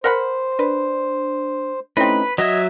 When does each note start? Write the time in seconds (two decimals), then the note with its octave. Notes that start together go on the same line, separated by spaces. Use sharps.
0.04 A#4 C5 F#5 B5
0.59 D4 B4
1.97 A3 C4 C#4 D#4 E4 B4
2.38 F#3 F#4 D#5 E5 G#6 B6